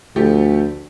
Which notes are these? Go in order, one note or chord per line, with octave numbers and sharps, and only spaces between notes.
D2 F3 A3 G4